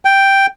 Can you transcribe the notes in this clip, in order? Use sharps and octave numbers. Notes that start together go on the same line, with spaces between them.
G5